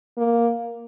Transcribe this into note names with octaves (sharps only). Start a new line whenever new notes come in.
A#3